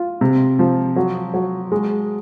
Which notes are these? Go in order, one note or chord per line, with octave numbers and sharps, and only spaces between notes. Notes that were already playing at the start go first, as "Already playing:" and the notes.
Already playing: F4
C3
F3
F#3
F#3
G#3